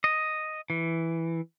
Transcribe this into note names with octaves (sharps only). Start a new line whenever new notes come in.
D#5
E3